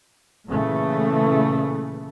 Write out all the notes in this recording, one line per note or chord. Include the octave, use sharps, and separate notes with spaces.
A#2 C#3 E3 A3